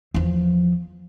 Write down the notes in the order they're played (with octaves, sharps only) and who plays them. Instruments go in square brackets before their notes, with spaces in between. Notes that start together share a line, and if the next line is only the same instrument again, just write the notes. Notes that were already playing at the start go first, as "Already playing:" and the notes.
[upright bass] E2 F3